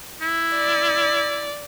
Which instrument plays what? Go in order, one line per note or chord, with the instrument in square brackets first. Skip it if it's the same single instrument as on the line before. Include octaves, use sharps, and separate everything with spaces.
[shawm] E4
[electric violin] D5